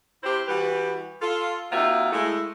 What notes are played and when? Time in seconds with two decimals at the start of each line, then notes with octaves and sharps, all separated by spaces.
0.23 C3 E4 G4 C5
0.47 E3 G3 F#4 G4 B4
1.21 F4 A4
1.72 C3 A#3 D#4 F4 F#4 E5
2.12 G#3 A3 E4